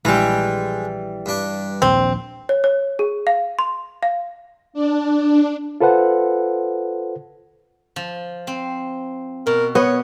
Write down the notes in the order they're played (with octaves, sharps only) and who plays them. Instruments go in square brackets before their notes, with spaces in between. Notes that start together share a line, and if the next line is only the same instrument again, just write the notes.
[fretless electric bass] A#1 [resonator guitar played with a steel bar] E3 G3 [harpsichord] G#3
[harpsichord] G2 D4
[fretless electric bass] A#1 D#2 [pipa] C4
[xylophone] C#5
C#5
G#4
F5
C6
F5
[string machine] D4
[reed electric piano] F4 A4 B4 C5 F#5
[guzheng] F3
C4
[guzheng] B2 [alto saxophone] A#4
[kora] B3 [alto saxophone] C#5 [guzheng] D#5